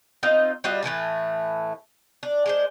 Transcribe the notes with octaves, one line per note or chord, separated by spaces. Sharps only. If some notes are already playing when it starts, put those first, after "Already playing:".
C4 D#4 F4 D#5
G3 F4 F#4 D#5
A2 E3 A3 A5
D4
G#3 D4 C5